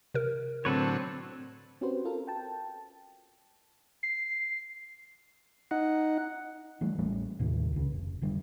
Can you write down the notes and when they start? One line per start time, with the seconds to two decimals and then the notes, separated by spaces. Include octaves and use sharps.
0.14 C3 A#4
0.65 A2 D3 F#3 C4 A4 B4 C#5
1.81 C4 C#4 F#4 G4 B4 C5
2.05 F4 A4 A#4
2.27 G5 A5
4.03 C7
5.71 D#4 F#5
6.81 E3 G3 A3
6.98 A1 G3 A3 C#4
7.39 D#2 A2 C3 D#3
7.73 C#2 C#3
7.93 F1
8.22 F1 D3 G3